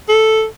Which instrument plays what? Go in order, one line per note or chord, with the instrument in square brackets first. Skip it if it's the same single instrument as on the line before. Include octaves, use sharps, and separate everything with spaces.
[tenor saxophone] A4